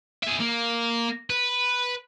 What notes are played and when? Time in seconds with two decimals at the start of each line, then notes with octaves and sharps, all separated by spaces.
0.23 G#4 E5
0.40 A#3
1.30 B4